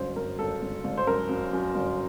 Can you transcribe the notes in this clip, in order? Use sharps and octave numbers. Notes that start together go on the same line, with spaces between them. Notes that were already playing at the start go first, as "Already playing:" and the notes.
Already playing: G1 F#2 C5
G1 A#4
G1 A4
G1
G1
C5
F#2 A#4
F#2
F#2
G1